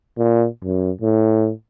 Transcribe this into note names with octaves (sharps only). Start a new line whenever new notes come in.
A#2
F#2
A2